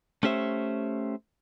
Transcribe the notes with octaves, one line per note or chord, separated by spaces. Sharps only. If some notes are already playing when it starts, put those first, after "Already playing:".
A3 C#4 G4 C5 E5